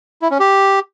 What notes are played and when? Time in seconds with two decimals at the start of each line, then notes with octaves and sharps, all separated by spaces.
0.22 E4
0.31 C#4
0.40 G4